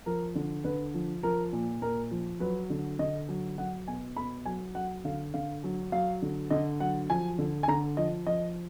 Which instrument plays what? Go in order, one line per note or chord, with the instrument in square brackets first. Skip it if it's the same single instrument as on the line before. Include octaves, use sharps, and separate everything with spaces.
[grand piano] F3 A#4
D3
D3 B4
F3
F3 A#4
A#2
A#2 A#4
F3
F#3 B4
D3
D3 D#5
F#3
F#3 F#5
B2 G#5
B2 B5
F#3 G#5
F#3 F#5
D3 F5
D3 F5
F#3
F#3 F5
D3
D3 D#5
F#3 F#5
F3 G#5
D3
G#5
D3 A#5
F3 D#5
F3 D#5